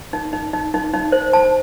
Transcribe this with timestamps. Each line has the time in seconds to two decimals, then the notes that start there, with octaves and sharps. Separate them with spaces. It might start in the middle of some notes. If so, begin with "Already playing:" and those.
0.13 D#4
0.33 D#4
0.53 D#4
0.74 D#4
0.94 D#4
1.12 C5
1.33 A5